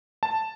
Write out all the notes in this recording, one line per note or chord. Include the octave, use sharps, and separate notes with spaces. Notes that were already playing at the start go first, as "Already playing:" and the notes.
A5